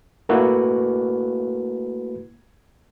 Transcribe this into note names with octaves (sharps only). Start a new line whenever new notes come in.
A3 A#3 E4 F#4 B4